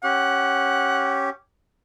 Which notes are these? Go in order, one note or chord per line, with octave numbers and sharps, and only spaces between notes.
C#4 G4 F#5